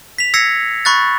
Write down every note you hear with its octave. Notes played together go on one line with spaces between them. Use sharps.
B6 F7
E6 G#6 A#6 C7 C#7
B5 C#6 F#6 A6